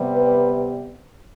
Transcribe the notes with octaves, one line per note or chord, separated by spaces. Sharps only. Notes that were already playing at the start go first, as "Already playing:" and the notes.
Already playing: C3 G3 B3
B4